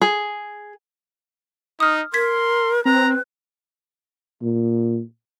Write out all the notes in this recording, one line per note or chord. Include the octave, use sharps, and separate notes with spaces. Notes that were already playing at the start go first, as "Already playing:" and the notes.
G#4
D#4 D#6 F6
A#4 C6 G#6 B6
C4 B4 A#5
A#2